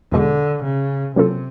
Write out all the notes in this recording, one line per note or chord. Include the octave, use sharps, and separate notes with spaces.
E2 B2 D3 G#3
C#3
C3 F#3 A#3 C#4 F4 A4